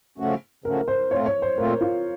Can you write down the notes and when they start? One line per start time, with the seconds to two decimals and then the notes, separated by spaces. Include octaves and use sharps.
0.18 C#3 F3 A3 C#4 F#4
0.64 C#3 F3 A3 C#4 F#4 A#4
0.88 C5
1.11 A#2 A3 C4 F4 C#5
1.26 C#5
1.42 C5
1.57 A#2 A3 C4 F4 A#4
1.81 F4